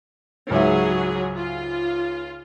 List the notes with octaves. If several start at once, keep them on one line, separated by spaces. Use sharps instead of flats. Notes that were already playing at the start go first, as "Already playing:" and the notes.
C#2 G#2 F#3 G#4 E5
F4